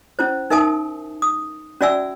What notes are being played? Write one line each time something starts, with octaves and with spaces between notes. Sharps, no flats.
C#4 E4 C5
D#4 A#4 E5 G#5 A5 D#6
D#6
C#4 F#4 D5 E5 G#5 E6